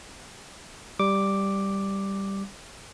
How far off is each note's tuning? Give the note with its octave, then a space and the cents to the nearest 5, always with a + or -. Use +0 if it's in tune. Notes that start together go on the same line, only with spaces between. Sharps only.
G3 +0 D6 +0